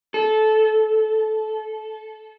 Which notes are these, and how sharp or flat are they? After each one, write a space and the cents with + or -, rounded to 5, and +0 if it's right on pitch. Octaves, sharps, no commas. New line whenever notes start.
A4 -20